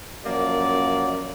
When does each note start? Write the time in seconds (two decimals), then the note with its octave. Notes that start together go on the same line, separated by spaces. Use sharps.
0.25 F#2 F3 A#3 D5